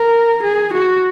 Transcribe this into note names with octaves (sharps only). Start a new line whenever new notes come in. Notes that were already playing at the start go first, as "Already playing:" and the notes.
Already playing: A#4
G#4
F#4